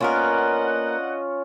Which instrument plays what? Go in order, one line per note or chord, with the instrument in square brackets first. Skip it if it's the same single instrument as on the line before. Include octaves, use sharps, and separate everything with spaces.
[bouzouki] A#3 B3 A#4 [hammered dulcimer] C#4 F4 [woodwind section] D4 D#5 F#5